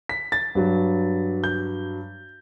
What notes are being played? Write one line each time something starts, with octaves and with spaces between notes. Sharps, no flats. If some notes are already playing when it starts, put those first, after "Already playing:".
B6
A6
G2 F#3
G6